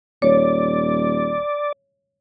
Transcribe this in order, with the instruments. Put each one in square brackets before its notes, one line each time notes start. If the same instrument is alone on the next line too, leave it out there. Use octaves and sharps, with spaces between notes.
[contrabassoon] D#1 [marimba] C#5 [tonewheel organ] D5